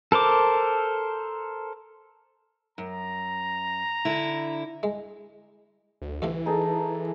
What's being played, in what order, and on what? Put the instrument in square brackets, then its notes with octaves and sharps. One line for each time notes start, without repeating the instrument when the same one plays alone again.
[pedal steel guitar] A4 A#4 C5 D6
[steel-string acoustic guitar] F#2 [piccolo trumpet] A#5
[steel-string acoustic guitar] D3 E4
[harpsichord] G#3
[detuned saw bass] D2
[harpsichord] D2 C3 F3 [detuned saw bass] E3
[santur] D#4 G#4 A4